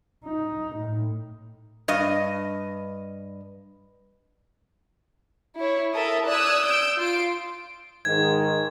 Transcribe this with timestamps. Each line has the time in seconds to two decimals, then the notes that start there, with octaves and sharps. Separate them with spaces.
0.25 D#4
0.76 A2
1.88 G2 D#5
5.58 E4 C#5
5.94 E4 A4 A#4 E5 D#6
6.28 D5 D#6 E6 F#6 G#6
6.66 E6 G6 D7
6.98 F4 C6 D7
8.05 G#2 D#3 G#6